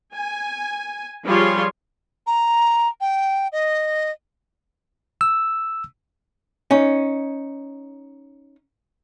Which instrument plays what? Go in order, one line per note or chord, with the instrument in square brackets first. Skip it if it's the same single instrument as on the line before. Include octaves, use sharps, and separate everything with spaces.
[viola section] G#5
F3 G3 F4 G#4 C#5 C6
[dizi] A#5
G5
D#5
[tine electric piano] E6
[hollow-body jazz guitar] C#4 D#4